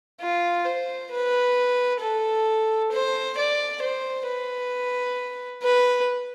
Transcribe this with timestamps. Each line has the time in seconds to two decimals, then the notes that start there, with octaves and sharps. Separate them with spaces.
0.21 F4
0.65 C5
1.11 B4
2.01 A4
2.92 C5
3.37 D5
3.82 C5
4.26 B4
5.63 B4